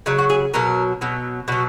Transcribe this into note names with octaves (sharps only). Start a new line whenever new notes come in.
C#3 F#3 D#4
F#4
G#4
B2 F#3 A#4
B2 F#3
B2 F#3 F#4